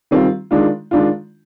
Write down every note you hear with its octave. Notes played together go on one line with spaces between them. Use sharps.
D#3 G3 C4 F4
D#3 G#3 D4 F4
D#3 G#3 D4 F4